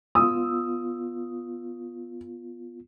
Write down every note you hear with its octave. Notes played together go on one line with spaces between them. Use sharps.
B3 F4 D#6 E6